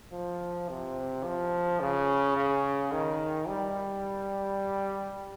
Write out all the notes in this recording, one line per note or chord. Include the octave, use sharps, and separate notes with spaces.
F3
C3
F3
C#3
C#3
D#3
G3